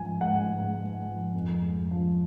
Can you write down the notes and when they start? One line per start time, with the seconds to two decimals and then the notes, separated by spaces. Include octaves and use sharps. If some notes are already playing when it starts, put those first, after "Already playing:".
Already playing: G#2 F3 G#5
0.21 G#2 F#5
0.49 G#2
0.78 G#3
1.07 F3
1.34 F2
1.62 G#3
1.91 F3